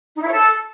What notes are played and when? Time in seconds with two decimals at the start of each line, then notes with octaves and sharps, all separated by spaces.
0.17 D#4
0.22 E4
0.28 C#5
0.33 A4